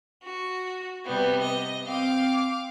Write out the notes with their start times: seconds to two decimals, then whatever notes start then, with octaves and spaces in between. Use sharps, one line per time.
0.23 F#4
1.05 C3 G3 B3
1.41 D#5
1.86 C4 F5 D6